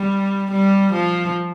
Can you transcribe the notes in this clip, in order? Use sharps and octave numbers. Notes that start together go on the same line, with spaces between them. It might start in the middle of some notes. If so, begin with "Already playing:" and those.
Already playing: G3
G3
F3